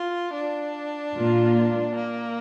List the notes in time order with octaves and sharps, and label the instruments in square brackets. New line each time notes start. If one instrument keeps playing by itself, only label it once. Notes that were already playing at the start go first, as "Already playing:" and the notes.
Already playing: [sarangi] F4
D4
[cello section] A#2 A#3 F4
[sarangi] A#3